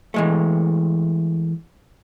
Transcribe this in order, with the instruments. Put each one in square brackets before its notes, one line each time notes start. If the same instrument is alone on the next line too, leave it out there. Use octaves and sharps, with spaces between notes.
[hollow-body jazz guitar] E3 G#3 A3